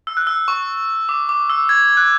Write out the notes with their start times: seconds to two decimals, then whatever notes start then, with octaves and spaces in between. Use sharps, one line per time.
0.07 E6
0.17 F#6
0.27 E6
0.48 C#6
1.09 D6
1.29 D6
1.50 E6
1.69 G#6
1.97 F#6